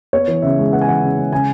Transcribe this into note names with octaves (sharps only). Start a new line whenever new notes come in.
B3 C#5
E3
C#3 E5
G#3
B3 F#5
G#5
E3 F#5
C#3
G#3
C#3 G#5